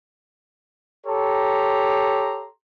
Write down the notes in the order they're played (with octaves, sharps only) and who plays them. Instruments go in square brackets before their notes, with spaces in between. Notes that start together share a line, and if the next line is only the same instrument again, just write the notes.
[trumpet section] G4 A4 C#5 A#5 C6